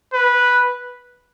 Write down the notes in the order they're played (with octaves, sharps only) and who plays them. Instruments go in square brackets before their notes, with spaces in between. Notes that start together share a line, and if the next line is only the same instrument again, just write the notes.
[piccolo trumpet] B4